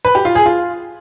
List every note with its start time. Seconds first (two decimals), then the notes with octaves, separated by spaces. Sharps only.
0.05 B4
0.15 G4
0.25 F4
0.35 G#4
0.46 F4